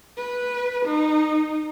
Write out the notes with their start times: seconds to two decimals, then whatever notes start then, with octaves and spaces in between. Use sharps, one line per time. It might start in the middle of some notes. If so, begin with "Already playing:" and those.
0.17 B4
0.85 D#4